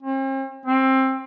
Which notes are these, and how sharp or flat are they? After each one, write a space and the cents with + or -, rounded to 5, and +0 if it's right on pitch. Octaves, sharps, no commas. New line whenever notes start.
C4 +45
C4 +20